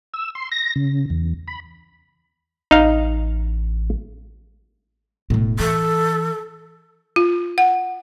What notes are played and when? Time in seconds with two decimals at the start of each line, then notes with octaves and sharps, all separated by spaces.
0.14 E6
0.35 C6
0.52 A#6
0.76 C#3
1.10 E2
1.48 B5
2.71 A1 D#4 F5
5.30 E1 A2
5.59 E3 A4
7.16 F4
7.58 F#5